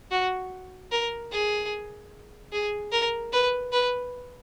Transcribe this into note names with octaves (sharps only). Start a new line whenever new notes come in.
F#4
A#4
G#4
G#4
A#4
B4
B4